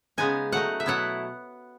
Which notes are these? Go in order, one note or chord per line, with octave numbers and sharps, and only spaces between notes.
C#3 G#3 B3 D#4 G#5
F#3 A3 D#4 F#5
E5
B2 F#3 B3 E4 F#5